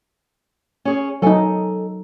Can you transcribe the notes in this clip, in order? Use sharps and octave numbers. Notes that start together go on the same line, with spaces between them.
C#4 G#4
F#3 D#4 A4 G#5